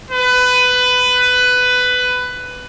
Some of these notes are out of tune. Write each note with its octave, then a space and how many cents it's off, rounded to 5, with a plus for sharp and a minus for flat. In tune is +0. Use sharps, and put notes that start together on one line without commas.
B4 +15